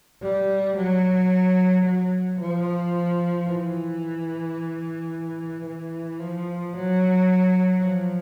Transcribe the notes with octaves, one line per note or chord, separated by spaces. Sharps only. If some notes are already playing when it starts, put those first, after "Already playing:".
G3
F#3
F#3
F3
E3
E3
F3
F#3
F3